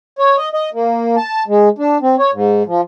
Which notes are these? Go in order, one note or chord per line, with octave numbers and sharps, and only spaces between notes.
C#5
D#5
D#5
A#3
A5
G#3
D4
C4
C#5
G#2
F3